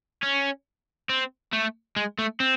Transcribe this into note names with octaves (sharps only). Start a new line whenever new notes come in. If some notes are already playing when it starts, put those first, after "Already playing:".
C#4
C4
A3
G#3
A3
C4